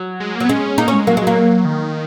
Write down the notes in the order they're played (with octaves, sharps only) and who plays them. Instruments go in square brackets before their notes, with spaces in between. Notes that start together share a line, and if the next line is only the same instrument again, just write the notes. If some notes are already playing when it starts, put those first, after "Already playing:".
Already playing: [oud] F#3
[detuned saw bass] G#3
[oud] F#3 [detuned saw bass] A#3
[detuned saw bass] B3
[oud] G#3 [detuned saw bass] C#4
[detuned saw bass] A#3 [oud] D#4
[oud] C#4
[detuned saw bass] G#3
[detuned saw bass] F#3 [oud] A#3
[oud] G#3
[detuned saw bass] F#3
[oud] A#3
[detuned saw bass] D#3